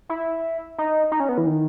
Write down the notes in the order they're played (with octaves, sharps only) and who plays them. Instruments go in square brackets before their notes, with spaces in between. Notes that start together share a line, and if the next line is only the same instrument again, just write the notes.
[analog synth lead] E4
D#4
D#4
C#4
B3
E3
D#3